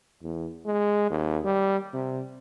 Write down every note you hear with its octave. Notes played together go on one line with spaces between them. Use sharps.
E2
G#3
D#2
G3
C3